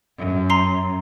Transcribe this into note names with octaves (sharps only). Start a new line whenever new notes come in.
F#2
A#5 C6 C7